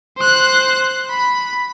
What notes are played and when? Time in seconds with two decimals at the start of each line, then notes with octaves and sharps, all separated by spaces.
0.17 C5 F#6
1.10 B5